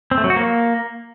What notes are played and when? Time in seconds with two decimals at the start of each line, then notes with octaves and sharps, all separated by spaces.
0.11 C4
0.18 A3
0.24 F#3
0.30 F#4
0.36 A#3